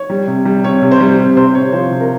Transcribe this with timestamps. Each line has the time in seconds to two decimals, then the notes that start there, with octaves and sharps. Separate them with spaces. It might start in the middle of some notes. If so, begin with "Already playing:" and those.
Already playing: C#5
0.10 G3
0.27 C3
0.45 G3
0.64 C3 C#5
0.82 C3
0.91 C5
1.00 G3
1.19 C3
1.36 C3 C5
1.55 C3 C#5
1.72 F3 C5
1.91 C3
2.01 A#4